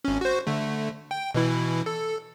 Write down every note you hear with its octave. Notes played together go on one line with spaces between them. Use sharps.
G#1 C#4
F#4 C5
D3 A3
G5
B2 E3 E4
A4